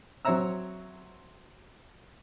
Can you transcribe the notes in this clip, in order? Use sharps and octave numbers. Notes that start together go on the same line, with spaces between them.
F#3 C4 C#5 E5 A#5 E6